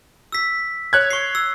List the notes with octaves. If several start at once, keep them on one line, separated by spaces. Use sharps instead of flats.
E6 B6
C#5 F#6 G#6
C#6 C7
E6